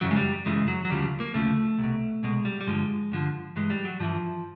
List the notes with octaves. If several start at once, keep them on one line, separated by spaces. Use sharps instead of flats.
F#2 C#3 E3 F#3
G#3
G3
F#2 C#3 E3 G#3
F#3
F#3
D2 C#3 F3 G3
A#3
D2 C#3 F3 A3
C2 B2
C2 B2 G#3
G3
G3
G2 D3 F3 G#3
G2 D3 F3
G2 E3 G#3
G3
F#3
G2 E3 F3